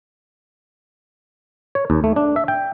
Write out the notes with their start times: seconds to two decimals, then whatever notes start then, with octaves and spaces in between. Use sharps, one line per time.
1.75 C#5
1.90 D#2
2.04 A3
2.16 D4
2.36 E5
2.48 G5